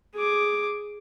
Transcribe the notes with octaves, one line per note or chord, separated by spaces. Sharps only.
G#4 D6